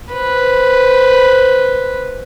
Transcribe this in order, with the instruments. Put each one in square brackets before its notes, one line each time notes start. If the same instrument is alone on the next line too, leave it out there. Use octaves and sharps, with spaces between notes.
[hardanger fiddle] B4 C5